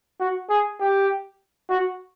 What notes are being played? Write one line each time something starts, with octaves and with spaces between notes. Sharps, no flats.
F#4
G#4
G4
F#4